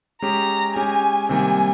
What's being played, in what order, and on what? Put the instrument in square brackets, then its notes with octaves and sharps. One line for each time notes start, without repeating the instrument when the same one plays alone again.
[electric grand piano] G#3 C#4 G4 [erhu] A#5
[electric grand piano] G#3 C#4 G4 [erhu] G#5
[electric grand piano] C3 D#3 G3 A#3 [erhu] G#5